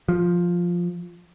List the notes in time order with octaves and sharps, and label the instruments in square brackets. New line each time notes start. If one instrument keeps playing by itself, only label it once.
[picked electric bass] F3